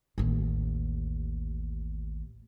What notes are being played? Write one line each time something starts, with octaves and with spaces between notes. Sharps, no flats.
A1 D#2